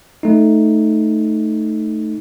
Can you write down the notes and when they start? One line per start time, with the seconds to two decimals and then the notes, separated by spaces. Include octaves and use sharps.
0.23 A3 D#4